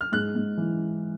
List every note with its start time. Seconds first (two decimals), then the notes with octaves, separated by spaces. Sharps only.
0.01 F6
0.12 G#2 F#6
0.35 G#2
0.57 E3